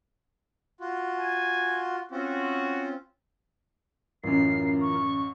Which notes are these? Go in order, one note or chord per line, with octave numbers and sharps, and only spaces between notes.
F4 F#4
G#5
C4 C#4 F4 F#4
A1 F#2 E3 F4 A#4 C7
C#6